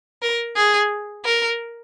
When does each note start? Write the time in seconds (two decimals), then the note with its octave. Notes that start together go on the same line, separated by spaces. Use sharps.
0.22 A#4
0.56 G#4
1.25 A#4